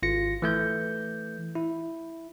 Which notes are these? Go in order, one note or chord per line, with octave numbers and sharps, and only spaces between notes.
G#1 F4 A#6 C#7
E3 A3 G6
E4